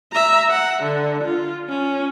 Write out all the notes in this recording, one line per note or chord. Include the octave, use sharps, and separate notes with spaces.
E5 A#5
F#5
D3
F4
C#4